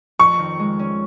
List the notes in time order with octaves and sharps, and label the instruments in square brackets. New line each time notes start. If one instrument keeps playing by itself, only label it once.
[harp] F2 [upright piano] C#6
[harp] D#3
G#3
C#4